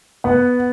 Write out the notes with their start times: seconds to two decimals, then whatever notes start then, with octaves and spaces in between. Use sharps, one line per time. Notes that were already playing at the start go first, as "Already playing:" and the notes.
0.24 B3 F#5